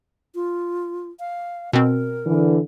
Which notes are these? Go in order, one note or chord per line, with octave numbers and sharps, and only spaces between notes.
F4
F5
B2 C4 A#4
D3 E3